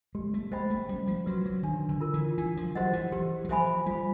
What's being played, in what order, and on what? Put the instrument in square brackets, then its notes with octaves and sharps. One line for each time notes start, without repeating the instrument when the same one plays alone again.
[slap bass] G#3 [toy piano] G4
[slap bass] A3
[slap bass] G#3 [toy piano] C5 D#5 G5 B5
[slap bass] A3
[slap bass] G3 [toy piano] C#4
[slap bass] F3
[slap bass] F#3 [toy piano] F#4 B4
[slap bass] F#3
[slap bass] D#3 [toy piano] D4
[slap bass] D3
[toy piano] F4 A#4
[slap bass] E3
[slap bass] E3 [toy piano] D4
[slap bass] F3
[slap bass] F#3 [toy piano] G4 C5 D#5 F#5
[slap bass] E3
[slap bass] E3 [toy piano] G4
[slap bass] F#3
[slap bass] F3 [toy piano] C5 E5 G#5 B5
[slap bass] G3 [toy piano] F4